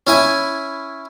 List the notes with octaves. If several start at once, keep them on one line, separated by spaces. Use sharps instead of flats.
C#4 E4 G#5